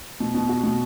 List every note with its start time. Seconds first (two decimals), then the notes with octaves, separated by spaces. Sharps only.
0.20 B2
0.35 B2
0.49 F#4
0.64 B2